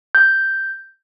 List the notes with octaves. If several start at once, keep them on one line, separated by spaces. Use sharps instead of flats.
G6